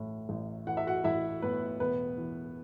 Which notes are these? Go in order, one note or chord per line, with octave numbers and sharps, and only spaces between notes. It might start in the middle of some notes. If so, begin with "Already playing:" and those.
Already playing: A1 A2
A1
E3 F#5
E5
F#4 F#5
A1 E4 E5
A2 B3 B4
E1 B3 B4
E3